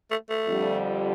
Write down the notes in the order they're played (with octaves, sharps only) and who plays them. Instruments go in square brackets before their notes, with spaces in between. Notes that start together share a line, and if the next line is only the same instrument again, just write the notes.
[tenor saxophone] A3
A3
[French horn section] F2 D3 G3